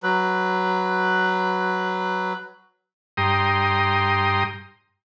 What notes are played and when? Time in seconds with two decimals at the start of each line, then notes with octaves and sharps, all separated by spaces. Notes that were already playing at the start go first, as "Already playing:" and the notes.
0.03 F#3 B4
3.17 G2 G5 A#5 C6 D#6